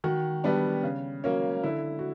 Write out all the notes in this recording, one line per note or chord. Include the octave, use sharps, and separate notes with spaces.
D#3 F#4
G3 B3 D4
C#3
F#3 A#3 C#4
D3 E4
F#4